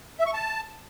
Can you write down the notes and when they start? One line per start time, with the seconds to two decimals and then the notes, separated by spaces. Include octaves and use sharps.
0.19 E5
0.26 C#6
0.33 A5